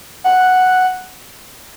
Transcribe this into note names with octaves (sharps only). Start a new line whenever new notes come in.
F#5